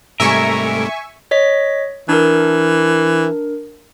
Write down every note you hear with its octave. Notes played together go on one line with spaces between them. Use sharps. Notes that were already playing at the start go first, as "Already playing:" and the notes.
G#2 C3 G3 A3 A#4 E5 G#5 C#6
C#5 D#5 B6
E3 D4 A#4